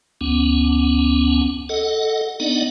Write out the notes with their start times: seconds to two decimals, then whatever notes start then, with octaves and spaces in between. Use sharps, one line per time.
0.21 D2 B3 C#4
1.69 A4 D#5 F#5
2.40 B3 D4 D#4 D5 D#5 F#5